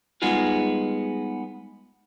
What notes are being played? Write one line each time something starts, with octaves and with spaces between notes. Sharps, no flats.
G3 G#3 B3 D#4 F4 G#4